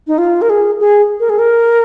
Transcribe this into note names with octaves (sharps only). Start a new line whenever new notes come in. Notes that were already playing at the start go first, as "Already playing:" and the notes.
D#4
F4
A#4
G#4
G#4
A#4
G#4
A#4